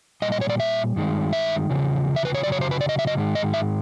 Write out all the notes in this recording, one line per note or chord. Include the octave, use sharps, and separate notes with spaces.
A#2 G3 D#5
D#5
C#5
D5
E5
G2 D#3 G#3
E5
E2 C#3 F3
E5
B4
C#5
F#2 C#3 F#3 D5
C#5
C5
B4
D5
D#5
E5
D#5
G#2 D#3 G#3
D#5
E5